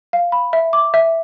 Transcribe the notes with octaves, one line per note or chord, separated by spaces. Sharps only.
F5
B5
E5
D6
E5